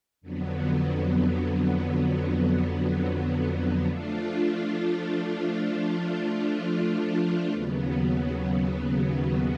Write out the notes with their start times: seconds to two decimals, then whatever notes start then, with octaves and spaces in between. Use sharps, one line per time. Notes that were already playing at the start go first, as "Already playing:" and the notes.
0.21 F2 D3 F#3 B3
3.85 F3 A3 D4 F4
7.49 D#2 C#3 F#3 B3